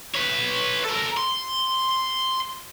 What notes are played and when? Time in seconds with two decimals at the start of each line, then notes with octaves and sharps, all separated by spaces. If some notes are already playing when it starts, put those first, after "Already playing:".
0.15 B4 C#5
0.84 A4 A#4
1.17 C6